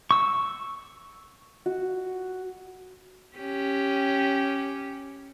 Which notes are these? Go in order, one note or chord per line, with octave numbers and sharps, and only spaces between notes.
C#6 E6
F#4
C#4 G4